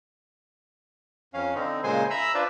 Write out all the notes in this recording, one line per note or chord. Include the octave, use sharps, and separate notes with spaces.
F2 C#4 F5
D3 C4 D#4
A#2 C#3 G#3 C5 G#5 C6
E5 A#5 B5 E6
D4 F4 B4 C5 D5